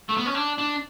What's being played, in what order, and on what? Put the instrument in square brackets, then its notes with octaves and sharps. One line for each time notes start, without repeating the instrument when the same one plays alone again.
[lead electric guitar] A3
B3
C#4
D4
D4